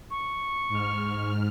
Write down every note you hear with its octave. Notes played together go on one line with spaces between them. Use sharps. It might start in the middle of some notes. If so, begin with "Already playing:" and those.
C#6
G#2 F6